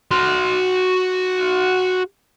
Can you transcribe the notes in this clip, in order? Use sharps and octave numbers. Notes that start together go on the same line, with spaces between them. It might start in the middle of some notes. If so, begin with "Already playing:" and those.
F#4 C6